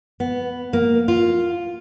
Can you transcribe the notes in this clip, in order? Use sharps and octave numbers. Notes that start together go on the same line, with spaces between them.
B3
A#3
F4